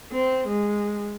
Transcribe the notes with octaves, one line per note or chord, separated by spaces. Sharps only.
C4
G#3